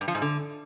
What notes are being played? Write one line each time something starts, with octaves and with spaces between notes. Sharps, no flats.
G2
F3
G#2
D3